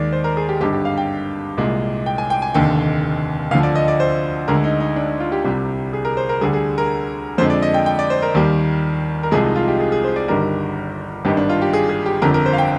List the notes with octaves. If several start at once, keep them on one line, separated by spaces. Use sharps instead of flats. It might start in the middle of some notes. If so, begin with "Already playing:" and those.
Already playing: D#2 D#3 G#3 D5
C5
A#4
G#4
G4
G#1 G2 D3 G4
G4
F5
G5
C2 A#2 G#3
G5
G#5
G5
G#5
F1 D#2 D3 G5
D2 D3 F3 F5
D5
D#5
D5
C5
D2 D3 G#3 A#4
D#4
D#4
D4
F4
G4
C2 C3 G3
G#4
A#4
C5
A#4
D2 D3 G3 G#4
G#4
A#4
F2 D3 G#3 C5
D5
D#5
G5
G5
D5
C5
A#4
D#2 D#3 G3
A#4
C2 C3 F3 G#3 G#4
D#4
F4
G4
G#4
G#4
C5
D5
G1 G2 D#3 G3 A#4
G#1 G2 D#3 G4
D4
F4
G4
G#4
G#4
G4
G1 F2 D3 A#4
A#4
C5
F5
G5